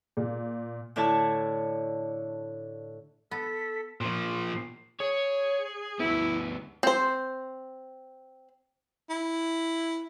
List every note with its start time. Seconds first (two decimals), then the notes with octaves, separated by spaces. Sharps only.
0.17 A#2
0.96 A2 D3 E4 C#5 D5 A5
3.31 B3 A4 B6
4.01 A#2 F3
5.00 G#4 C#5
6.00 D2 B3 E4
6.83 C4 C5
9.10 E4